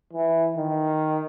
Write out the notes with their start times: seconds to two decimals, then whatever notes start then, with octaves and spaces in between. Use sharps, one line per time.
0.13 E3
0.57 D#3